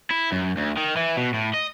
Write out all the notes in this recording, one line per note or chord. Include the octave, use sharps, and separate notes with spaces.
E4
F#2
D2
D#3
E3
B2
A2
D#5